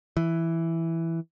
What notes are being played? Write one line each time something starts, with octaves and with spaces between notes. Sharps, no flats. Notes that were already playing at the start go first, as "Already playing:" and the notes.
E3